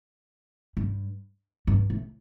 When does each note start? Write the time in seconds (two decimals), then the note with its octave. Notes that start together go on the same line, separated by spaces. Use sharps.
0.77 G2
1.67 G2
1.90 A2